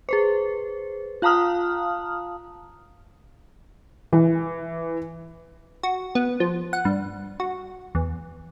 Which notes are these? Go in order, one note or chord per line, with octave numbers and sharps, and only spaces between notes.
G#4 B4 C5
F4 F5 A5 A#5 D#6 F6
E3
F#4
B3
F3
F#5
G2
F#4
E2